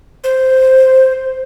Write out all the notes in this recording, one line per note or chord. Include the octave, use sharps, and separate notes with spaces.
C5